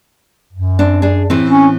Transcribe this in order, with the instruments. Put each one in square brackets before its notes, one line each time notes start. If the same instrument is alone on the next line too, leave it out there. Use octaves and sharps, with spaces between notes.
[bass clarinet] F#2
[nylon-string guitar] C4 D4
D4 G#4
A2 E3 C4
[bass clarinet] C#4